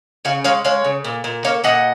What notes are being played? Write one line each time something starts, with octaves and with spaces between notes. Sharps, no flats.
C#3 C#5 F5
G#3 C#5 F5
G#3 C#5 F5
C#3
A#2
A#2
A#3 C#5 F5
A#2 D#5 F#5